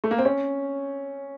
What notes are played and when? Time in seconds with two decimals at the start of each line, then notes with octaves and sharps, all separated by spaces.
0.04 A3
0.11 A#3
0.18 C4
0.25 C#4